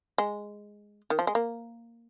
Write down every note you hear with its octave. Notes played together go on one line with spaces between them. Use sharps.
G#3
D#3
F3
G#3
A#3